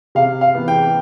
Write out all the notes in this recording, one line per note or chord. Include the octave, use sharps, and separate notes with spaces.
C3 F5
F5
E3 B3
G5